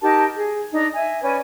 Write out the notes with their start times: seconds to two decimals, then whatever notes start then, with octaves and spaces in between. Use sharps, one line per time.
0.01 D#4 G4 A#4 A5
0.35 G#4
0.71 D4 D#4
0.95 E5 G#5
1.21 C#4 B4 D5 G#5